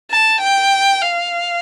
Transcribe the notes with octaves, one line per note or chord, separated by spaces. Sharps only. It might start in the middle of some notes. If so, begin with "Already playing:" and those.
A5
G5
F5